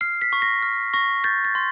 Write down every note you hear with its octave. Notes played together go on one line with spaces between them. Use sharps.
F6 C7
B6
C#6
A#6
F6
C#6 A#6
G6 A6
A6
C6